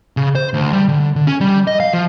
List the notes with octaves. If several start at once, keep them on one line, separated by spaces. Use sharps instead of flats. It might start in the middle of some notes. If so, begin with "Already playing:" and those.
C#3
C5
D2
G3
D3
D3
C#4
G3
D#5
F5
F3